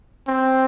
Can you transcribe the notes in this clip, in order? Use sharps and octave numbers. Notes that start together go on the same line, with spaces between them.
C4